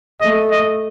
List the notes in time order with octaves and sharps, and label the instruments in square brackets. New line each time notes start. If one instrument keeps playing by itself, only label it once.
[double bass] A3 [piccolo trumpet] D#5
[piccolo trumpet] D#5